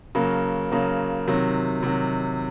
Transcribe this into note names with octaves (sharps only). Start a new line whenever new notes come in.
C#3 F#3 A#3
C#3 F#3 A#3
C3 D#3 F#3
C3 D#3 F#3